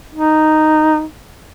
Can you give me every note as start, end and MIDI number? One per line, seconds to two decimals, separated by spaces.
0.15 1.05 63